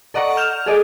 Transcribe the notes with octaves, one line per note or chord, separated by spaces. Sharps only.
A4 D5 D#5 F#5 A#5 C#6
F6 G6 E7 F7
G#4 A4 D5 D#5